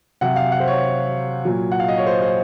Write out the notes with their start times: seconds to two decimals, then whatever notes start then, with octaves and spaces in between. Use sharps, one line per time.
0.21 C3 F#3 F#5
0.36 F5
0.52 F#5
0.60 C5
0.68 C#5
1.45 A#2 F#3
1.72 F#5
1.80 F5
1.88 D#5
1.98 C#5
2.07 C5
2.22 C5